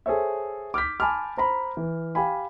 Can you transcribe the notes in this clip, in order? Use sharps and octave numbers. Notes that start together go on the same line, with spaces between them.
G#4 A4 C5 C#5 E5
D6 F6 G6 B6
G#5 A5 B5 C6 D6 F6
C5 A#5 B5
E3
G4 F5 G#5 B5